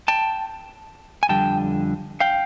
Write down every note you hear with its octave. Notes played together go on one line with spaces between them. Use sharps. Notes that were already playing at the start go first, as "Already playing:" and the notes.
G5 A5
G#5
F2 D3 G3 G5 A5
F5 G5